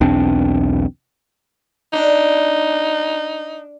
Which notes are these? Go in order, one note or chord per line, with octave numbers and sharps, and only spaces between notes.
B1 E2 C4 D4
D4 D#4